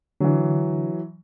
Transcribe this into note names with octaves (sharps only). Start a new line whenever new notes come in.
D3 E3 F#3